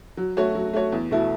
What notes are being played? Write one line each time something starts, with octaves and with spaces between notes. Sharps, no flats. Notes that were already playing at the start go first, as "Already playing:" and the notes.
F#3
A3 F#4 C#5
F#3
A3 F#4 C#5
E2
B2 A3 E4